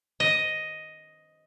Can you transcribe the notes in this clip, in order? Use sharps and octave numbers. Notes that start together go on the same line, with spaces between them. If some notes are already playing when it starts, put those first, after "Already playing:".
D#5